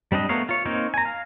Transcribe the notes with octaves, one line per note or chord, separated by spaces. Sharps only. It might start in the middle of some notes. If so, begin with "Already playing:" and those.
G3 C4 D4 D#5
A3 B3 A#4 C#5 F5
F4 C#5
A#3 C4 D#4 C#5
G#5 A#5
F5